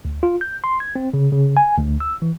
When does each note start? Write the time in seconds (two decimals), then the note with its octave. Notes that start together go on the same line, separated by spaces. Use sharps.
0.05 D2
0.23 F4
0.41 G6
0.64 C6
0.80 G#6
0.96 C4
1.14 C#3
1.32 C#3
1.57 G#5
1.77 D2
2.00 E6
2.22 E3